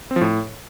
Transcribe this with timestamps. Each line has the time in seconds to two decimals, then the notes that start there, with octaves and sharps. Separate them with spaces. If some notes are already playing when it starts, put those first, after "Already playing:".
0.11 C4
0.16 F3
0.21 A2